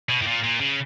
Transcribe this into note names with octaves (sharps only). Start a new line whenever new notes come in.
B2
A2
A#2
A#2
C#3